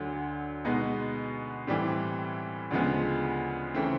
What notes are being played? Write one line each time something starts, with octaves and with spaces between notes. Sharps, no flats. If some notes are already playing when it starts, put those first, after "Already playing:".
Already playing: D2 D3 F#3
B2 G#3 B3 D#4
A2 E3 G3 C4
D2 C#3 F3 G#3 B3
C#3 E3 A3 C4